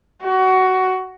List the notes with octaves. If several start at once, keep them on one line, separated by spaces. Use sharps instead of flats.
F#4